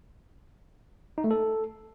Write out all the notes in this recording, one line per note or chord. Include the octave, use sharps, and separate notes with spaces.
D#4
A3
A4